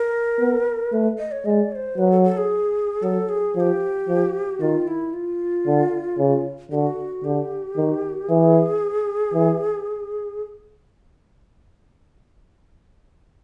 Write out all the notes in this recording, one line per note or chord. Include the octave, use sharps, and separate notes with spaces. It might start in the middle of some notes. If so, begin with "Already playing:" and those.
Already playing: A#4
B3
A3 B4
D#5
C#5
G#3 D5 D#5
C#5
C5
F#3 B4
A4
A4
G#4
F#3 A4
G#4
F3 G4 G#4
F3
D#3 F4
E4
F4
D3
C#3
D3 F#4 G4
D3 G4
D#3
E3 G#4
E3